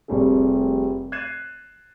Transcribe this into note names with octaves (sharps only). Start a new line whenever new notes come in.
F1 G3 A3 C4 G#4
F#6 G#6 A6 C7 D#7 E7